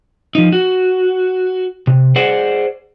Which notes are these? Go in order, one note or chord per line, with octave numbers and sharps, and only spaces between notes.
F3 D#4
F#4
C3
G#4 C5 D5 F#5